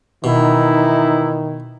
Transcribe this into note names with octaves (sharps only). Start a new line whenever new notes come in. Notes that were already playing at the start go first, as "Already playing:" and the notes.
B2 D#3 E3 D#4 E4